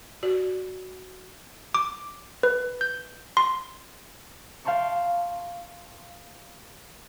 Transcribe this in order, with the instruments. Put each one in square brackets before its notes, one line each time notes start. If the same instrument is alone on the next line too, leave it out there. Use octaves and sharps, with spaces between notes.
[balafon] F#4 D5
[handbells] D6
B4
G6
C6
[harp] F5 G5 A5 C6 C#6